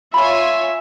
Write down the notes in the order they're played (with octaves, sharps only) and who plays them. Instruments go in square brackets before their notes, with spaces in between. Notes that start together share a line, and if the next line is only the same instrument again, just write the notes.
[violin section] F4 C#5 G#5 [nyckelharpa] E5 [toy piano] B5 C#6